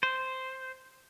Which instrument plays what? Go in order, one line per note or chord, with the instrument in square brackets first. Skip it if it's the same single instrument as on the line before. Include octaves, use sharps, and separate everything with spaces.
[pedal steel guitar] C5